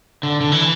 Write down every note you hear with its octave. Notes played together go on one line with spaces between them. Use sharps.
D3
D3
E3